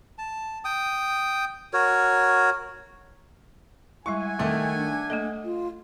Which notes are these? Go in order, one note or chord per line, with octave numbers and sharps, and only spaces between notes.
A5
G5 D#6
F#4 A#4 C#5
G3 G#3 E4 E5 F#5 G#5 C#6
D#3 A3 C4 D6
D4
A3 A#3 A4 D#5
F4